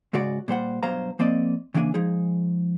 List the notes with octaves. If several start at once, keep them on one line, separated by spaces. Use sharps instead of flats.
G#2 C#3 G#3 F#4 D5
A#2 G3 C5 F#5
G2 B2 F#3 C5 F5 A#5
F3 A#3 C4 D5 D#5
C#3 E3 A#3 D4 F#5 G#5
F3 G#3 D#4 G#4